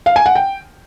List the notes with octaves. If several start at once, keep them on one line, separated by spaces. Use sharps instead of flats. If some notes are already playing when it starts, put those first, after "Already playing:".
F5
G#5
F#5
G5